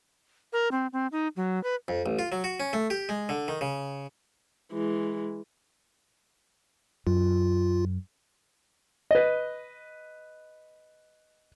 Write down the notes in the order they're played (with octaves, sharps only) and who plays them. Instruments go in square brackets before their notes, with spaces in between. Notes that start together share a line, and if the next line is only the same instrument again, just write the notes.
[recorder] A#4
C4
C4
D#4
F#3
B4
[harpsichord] F2
A1
F4
F#3
F#4
C#4
A3
G4
G#3
D3
D#3
C#3
[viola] E3 G#3
[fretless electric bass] F#2 [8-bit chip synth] F4
[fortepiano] B4 D#5